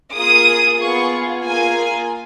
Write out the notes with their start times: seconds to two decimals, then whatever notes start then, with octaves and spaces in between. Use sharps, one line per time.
0.15 A#3 F4 G#4 D#6
0.78 B3 F4 G#4 C#6
1.43 A#3 F4 G#4 G#5